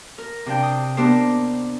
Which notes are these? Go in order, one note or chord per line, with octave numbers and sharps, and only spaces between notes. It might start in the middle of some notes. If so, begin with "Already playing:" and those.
A#4
C3 D4 G5
D#6
B3 D4 G4 A#4 C5